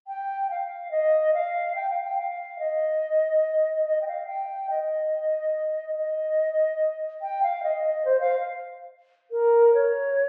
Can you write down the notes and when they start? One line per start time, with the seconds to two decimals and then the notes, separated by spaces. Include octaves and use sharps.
0.07 G5
0.50 F5
0.91 D#5
1.34 F5
1.75 G5
1.90 F5
2.04 G5
2.18 F5
2.59 D#5
3.86 D#5
4.01 G5
4.07 F5
4.27 G5
4.70 D#5
5.95 D#5
7.21 G5
7.43 F5
7.63 D#5
7.84 D#5
8.05 C5
8.20 F5
9.31 A#4
9.74 C#5